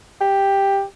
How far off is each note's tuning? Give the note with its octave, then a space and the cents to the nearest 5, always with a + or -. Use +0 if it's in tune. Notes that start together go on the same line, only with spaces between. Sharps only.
G4 +5